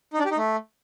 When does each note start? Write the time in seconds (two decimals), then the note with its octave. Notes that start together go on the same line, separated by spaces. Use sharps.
0.14 D#4
0.19 D4
0.25 G4
0.31 D#4
0.37 A3